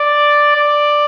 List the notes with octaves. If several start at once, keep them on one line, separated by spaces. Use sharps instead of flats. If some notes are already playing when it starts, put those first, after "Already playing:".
Already playing: D5
D5